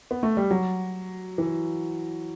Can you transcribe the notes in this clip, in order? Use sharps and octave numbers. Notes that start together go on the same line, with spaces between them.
B3
A3
G3
F#3
E3